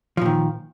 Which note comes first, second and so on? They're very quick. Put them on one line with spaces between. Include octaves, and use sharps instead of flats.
F3 A#2 D#3